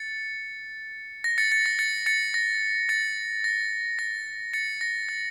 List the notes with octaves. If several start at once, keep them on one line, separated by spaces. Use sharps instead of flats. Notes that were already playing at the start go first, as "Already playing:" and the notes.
Already playing: A6 C#7
A#6
A6 C#7
A6 C#7
A#6
A6 C#7
A6 C#7
A#6
A6 C#7
A#6
A#6
A6 C#7
A#6
A6